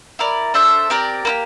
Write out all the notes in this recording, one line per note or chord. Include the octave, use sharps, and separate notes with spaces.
E4 A#4 D5
D4 A4 C5 E5
C4 G4 A#4 D5
A#3 E4 G4